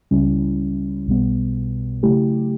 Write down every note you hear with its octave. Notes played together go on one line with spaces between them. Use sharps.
C#2 C#3 G3 C#4 E4
B1 B2 G3 B3
C#3 F#3 A3 E4 G4